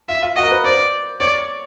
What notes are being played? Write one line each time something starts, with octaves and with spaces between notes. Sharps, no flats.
F4 E5
F4
F#4 D#5
A#4
B4
C5 D5
C#5 D5